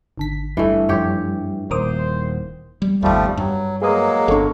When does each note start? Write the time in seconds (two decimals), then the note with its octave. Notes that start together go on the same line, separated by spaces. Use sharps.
0.18 G#1 D3 B6
0.57 G2 E3 A3
0.89 F#2 F3 G4 C#5
1.71 D#1 A#4 C5 D6 D#6
2.82 G3
3.02 G1 D#2 F3 G3 A3
3.37 G2 F#3
3.82 F#3 G#3 A#3 G#4 B4 D#6
4.28 G1 D4 A4 C#6